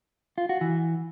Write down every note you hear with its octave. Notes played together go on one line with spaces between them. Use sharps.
F4
F#4
E3